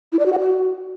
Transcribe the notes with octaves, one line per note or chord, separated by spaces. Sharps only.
E4
D5
F#4
F#5
F#4